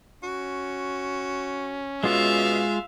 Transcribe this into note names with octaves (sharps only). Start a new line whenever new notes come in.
C#4 F#4
B2 G#3 F4 E5 F5